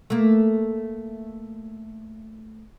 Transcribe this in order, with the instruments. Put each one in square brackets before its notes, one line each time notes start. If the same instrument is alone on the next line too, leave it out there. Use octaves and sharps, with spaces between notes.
[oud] A3 A#3